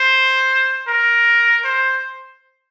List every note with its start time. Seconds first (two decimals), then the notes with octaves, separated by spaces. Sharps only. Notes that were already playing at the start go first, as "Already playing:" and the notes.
Already playing: C5
0.88 A#4
1.65 C5